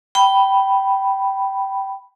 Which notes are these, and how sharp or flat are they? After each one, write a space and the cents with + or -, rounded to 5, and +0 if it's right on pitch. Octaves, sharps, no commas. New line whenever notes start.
G5 -15 B5 +0